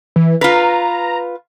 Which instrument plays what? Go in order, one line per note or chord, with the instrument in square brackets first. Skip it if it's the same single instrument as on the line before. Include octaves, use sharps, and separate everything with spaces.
[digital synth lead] E3
[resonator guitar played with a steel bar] F4 B4 [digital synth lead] A#5